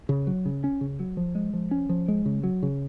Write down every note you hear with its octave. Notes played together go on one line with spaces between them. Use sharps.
C#3
F#3
C#3
C#4
C#3
F#3
F3
G#3
F3
C#4
F3
G#3
C#3
F#3
C#3